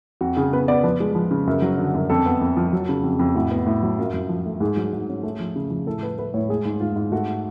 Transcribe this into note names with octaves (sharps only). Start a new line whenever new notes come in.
F2 F#4
C#3 G#4
B3 B4
B3 D5
F3 B4
G#3
F3
C#3
F#2
F#3
D3
F#2
F2 A4
B3
F2
F3
F#3
C#3
F2
F2
A2 F#4
B3
A2
F#3
F#2 F4
F#2
F3
A3
G#2 G#4
F#3
G#2
C#4
A3
F3
C#3
F3
A2 A4
A3 B4
A3 B4
A2 C#5
G#3 G#4
G#2
G#2 F4
G#2
A3 F#4